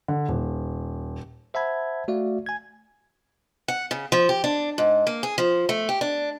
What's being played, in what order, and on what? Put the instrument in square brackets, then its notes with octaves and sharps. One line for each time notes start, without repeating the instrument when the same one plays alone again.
[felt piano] D3
D#1
[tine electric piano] C5 E5 F#5 A5 B5 G#6
A3 F#4 D5 E5 F5
G#5 G#6
[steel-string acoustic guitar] F#5
C#3
F3
G4
D4
G#2
A#3
G#4
F3
A3
G4
D4